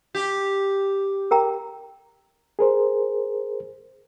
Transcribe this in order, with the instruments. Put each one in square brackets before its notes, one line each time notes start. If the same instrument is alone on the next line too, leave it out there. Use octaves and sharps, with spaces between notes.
[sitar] G4
[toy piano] A#4 G5 A#5
[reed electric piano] G#4 A#4 C5